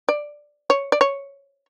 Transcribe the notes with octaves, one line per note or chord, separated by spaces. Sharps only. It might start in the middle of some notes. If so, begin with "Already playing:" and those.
D5
C#5
D5
C#5